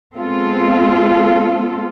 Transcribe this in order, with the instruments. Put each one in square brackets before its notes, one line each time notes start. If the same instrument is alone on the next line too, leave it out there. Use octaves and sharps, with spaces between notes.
[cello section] G#3 B3 C4 F4 A4